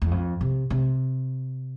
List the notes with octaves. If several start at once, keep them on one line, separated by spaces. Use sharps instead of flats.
E2
F2
C3
C3